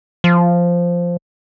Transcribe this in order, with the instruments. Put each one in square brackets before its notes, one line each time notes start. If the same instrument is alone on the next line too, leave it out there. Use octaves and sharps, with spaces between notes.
[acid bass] F3